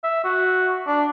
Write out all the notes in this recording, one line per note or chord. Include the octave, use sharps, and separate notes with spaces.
E5
F#4
D4